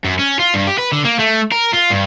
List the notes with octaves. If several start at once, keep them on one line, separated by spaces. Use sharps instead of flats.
F#2
C#4
F4
G2
G4
B4
D3
A#3
A3
A#4
F4
G2